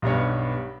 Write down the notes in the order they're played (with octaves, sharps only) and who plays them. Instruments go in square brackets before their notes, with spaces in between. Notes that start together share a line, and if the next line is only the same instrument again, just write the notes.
[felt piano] B1 G2 B3 C#5